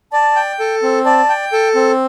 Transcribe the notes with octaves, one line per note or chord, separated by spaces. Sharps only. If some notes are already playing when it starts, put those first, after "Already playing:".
D5 A5
G5
A4
C4
D5 A5
G5
A4
C4